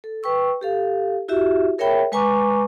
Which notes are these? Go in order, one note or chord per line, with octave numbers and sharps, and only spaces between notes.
A4
B4 G5 C#6 E6
G4 A4 F5
E4 F#4 G4 E5
G#4 A#4 C#5 E5 G5 B5
G#3 B4 G#5 A#5 C#6 D6